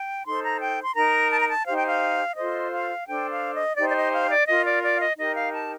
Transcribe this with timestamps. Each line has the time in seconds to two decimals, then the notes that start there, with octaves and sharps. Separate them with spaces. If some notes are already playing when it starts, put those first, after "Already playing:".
Already playing: G5
0.24 D#4 A4 C5 C6
0.42 A#5
0.60 G5
0.83 C6
0.95 D#4 A#4 A#5
1.31 A5
1.39 A#5
1.48 A5
1.66 D#4 G4 C5 F5
1.75 G5
1.85 F5
2.36 F4 A4 C5 D#5
2.71 F5
3.06 D4 A4 C5 G5
3.29 F5
3.53 D#5
3.77 D#4 G4 C5 D5
3.89 D5
3.95 D#5
4.13 F5
4.29 D5
4.47 F4 A#4 D#5
4.64 D5
4.83 D5
4.96 F5
5.01 D#5
5.18 D#4 G4 A#4 D#5
5.35 F5
5.54 A5